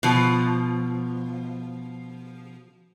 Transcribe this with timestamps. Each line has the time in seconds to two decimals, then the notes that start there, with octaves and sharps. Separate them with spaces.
0.03 B2 F3